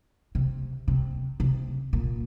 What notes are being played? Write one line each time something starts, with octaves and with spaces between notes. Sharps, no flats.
C3
C3
C3
A#2